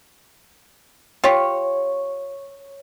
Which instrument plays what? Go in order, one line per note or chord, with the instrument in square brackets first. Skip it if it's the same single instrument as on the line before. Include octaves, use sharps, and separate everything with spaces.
[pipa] F4 G4 [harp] C#5